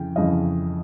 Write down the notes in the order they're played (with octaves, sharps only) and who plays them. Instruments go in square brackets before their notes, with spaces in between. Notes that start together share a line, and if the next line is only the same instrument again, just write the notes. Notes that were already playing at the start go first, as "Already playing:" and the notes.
Already playing: [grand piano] F2 C#3 E3 G5
F2 C#3 E3 D#5 F5